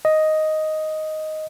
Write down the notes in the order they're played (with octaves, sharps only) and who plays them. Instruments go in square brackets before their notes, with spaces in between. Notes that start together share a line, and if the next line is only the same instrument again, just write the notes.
[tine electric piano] D#5